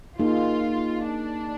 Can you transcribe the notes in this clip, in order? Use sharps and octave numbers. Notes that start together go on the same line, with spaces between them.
A#3 D#4 F4 G#4
D4